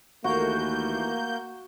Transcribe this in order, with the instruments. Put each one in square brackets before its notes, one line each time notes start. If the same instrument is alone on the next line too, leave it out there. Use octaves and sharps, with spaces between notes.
[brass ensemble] D#2 E3 A3 [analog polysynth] A#3 G6 [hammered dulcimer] F#4